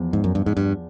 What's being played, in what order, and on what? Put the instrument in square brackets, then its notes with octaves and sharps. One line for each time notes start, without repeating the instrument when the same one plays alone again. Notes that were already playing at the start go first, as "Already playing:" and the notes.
Already playing: [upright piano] E2 F3
[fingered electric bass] G#2
F#2
G2
G#2
G2